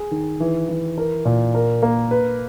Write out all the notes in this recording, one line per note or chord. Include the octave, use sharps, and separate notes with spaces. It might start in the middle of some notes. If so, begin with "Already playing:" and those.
Already playing: G#4
D#3
E3
E3
A#4
A#2
A#4
A#3
B4